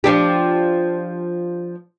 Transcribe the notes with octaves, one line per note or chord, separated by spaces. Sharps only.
F3 D4 G4